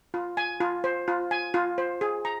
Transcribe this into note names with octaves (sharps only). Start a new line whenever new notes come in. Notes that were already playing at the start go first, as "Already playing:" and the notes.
F4
G#5
F4
C5
F4
G#5
F4
C5
G#4
A#5